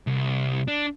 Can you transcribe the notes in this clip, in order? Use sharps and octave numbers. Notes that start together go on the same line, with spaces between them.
C2
D4